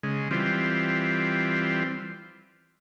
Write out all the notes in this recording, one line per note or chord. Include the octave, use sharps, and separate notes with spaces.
C#3 G#3
E3 G3 C4 F4